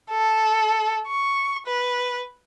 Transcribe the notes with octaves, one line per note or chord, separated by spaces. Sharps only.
A4
C#6
B4